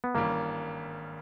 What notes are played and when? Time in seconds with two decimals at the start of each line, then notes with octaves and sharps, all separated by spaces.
0.04 B3
0.15 G#1 G2 E3 G3 A#3 C#4